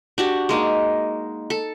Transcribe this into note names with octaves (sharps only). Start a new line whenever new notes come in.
D4 F#4 G4
G#3 A#3 D#4
A4